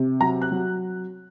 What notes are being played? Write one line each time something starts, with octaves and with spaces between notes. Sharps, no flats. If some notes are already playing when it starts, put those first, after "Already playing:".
Already playing: C3
F#3 A#5
F#6
F#3